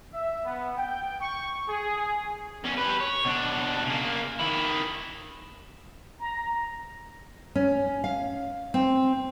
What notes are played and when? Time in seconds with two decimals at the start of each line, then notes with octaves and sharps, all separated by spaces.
0.13 E5
0.45 B3
0.77 G5
1.21 C#6
1.68 G#4
2.64 E2 C#4
2.77 G4 B4
3.01 C#5
3.25 B2 D4
3.85 C#3 A#3
4.40 D#3 E4
6.20 A#5
7.55 C#4
8.04 F5
8.74 C4